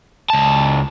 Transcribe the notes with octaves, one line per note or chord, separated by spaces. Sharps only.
C#2 A5